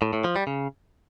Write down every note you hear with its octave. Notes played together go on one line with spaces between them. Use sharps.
A2
A2
F3
G3
C#3